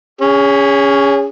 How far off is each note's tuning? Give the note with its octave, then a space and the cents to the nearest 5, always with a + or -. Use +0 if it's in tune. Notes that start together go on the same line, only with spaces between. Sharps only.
C#4 +15 G#4 -25